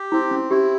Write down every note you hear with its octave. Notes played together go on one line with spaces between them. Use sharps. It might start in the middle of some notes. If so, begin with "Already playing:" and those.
Already playing: G4
C4 E4
C#4
E4 G4